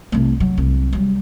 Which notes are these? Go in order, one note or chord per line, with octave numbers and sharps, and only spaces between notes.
C2 A3
F#3
C2
F#3 G3